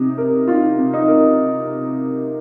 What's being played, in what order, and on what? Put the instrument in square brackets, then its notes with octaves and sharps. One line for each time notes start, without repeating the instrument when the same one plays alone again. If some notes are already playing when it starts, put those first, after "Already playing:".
Already playing: [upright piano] C3 D#4
A#4
[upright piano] D#4 [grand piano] F4
[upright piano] C3
[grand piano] D#4
[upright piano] A#4